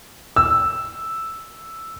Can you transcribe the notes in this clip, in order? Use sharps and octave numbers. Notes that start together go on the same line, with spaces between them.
E6